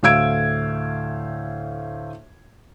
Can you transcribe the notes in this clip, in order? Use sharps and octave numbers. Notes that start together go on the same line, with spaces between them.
D2 A2 F5 E6 G#6 D7